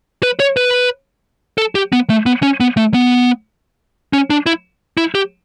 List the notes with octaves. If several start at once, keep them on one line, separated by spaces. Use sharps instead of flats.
B4
C#5
B4
A4
G4
B3
A3
B3
C#4
B3
A3
B3
C#4
D4
E4
E4
G4